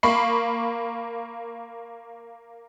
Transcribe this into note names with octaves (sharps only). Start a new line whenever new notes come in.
A#3 B5 C#6 C7